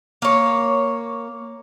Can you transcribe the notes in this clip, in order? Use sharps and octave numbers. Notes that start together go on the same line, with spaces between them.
A#3 C#5